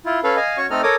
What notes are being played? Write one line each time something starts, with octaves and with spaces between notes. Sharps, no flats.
E4 F4
C#4 A4 B4 F5
D#5 F5 G#5
C#4 F#4 C#5 C#6
A3 C4 D#4 A4 D#5 F6
A4 A#4 C#5 D6 D#6